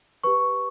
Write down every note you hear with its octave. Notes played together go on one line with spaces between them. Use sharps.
G4 B4 C#6